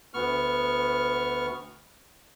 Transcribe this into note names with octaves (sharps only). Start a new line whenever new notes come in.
D2 B3 C#6 F6